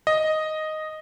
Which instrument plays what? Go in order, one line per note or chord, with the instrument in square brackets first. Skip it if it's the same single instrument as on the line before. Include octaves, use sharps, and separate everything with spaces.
[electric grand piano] D#5